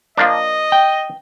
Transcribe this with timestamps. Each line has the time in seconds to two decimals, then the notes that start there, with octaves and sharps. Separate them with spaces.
0.18 F3 A#3 D4 D#5
0.72 G5